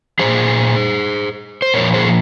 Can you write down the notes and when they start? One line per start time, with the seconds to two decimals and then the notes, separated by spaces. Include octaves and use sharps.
0.19 A#2 F3 G#4 C5
1.62 C5
1.74 A#2 F3 A#4 C#5
1.94 G#4 C5